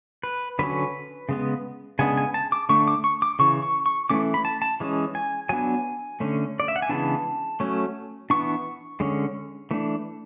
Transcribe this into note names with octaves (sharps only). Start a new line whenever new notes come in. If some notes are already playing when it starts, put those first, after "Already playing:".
B4
D3 F#3 C#4 B4
C#3 G#3 B3
C#3 G#3 B3 D4 G#5
G#5
A5
D6
D3 A3 D4 C#6
D6
C#6
D6
C#3 E3 C#6
C#6
C#6
E3 A3 C#4 D6
B5
A5
A5
E3 G#3 C#4
G#5
F#3 B3 D4 G#5
D3 A3 C#4
D5
E5
F#5
G#5
C#3 E3 G#3 B3 D4 A5
F#3 A3 C#4
E3 B3 D4 C#6
D3 G#3 C#4
E3 A3 D4